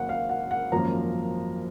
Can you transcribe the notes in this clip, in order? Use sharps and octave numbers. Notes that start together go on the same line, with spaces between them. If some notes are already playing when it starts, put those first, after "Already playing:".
Already playing: G#1 G#2 F#3 A#3 F#5
F5
F#5
F#5
G#1 F#2 F3 A#3 A#5